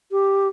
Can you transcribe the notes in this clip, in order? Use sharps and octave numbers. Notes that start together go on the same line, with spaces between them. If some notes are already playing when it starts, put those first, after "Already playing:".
G4